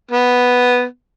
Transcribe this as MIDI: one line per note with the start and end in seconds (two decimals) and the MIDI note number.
0.11 0.84 59